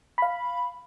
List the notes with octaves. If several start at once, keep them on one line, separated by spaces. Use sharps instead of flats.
F5 B5